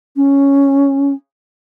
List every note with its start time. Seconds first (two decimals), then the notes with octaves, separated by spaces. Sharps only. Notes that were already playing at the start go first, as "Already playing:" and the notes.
0.16 C#4